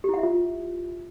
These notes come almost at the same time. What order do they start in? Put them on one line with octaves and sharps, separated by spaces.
G4 E4 F#5 E5 F4